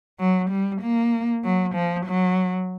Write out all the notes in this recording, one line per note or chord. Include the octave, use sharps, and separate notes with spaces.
F#3
G3
A#3
F#3
F3
F#3